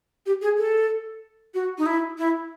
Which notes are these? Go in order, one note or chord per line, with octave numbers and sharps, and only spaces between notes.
G4
G#4
A4
F#4
D#4
E4
E4